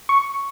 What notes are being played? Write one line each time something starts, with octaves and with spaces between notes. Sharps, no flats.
C#6